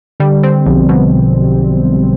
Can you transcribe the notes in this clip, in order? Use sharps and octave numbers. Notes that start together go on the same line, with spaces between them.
D3 G3
C4
B1 F3
B2